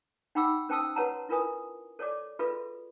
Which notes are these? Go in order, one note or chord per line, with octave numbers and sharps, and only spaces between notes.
D#4 F#5 G5 B5 D6 E6
C#4 C5 G5 A5 D#6 E6
F#4 B4 C#5 F#5 A5 A#5
E4 F4 A#4 B4 G#5 D#6
A4 C#5 D5 D6
F4 F#4 G#4 A4 B4 E5